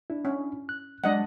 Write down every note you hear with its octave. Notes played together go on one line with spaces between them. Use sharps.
D4 E4
C#4
F#6
F#3 G#3 D4 D#5 F#5